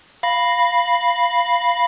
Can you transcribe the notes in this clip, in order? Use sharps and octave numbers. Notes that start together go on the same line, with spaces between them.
F5 B5 A#6